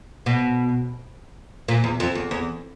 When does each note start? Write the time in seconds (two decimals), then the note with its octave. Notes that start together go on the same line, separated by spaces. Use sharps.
0.26 B2
1.68 A#2
1.84 E2
2.00 F2
2.15 E2
2.31 E2